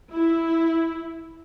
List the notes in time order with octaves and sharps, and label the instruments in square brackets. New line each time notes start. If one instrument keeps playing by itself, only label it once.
[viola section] E4